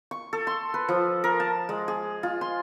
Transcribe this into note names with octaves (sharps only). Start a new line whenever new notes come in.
C#6
A4
C6
B4
F3
A#4
A5
G#3
G#4
F4
C6